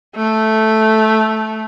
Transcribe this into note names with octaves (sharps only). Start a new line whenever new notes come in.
A3